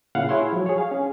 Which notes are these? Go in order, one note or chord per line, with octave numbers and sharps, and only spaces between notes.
A#2 C#3 E4 F5 F#5
E4 G#4 C#5 E5 F#5 C6
F3 F#3
G#4 C#5
F5
C#4 G#4